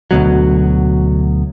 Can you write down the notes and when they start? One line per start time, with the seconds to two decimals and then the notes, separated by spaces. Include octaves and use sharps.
0.11 D2 B2 F#3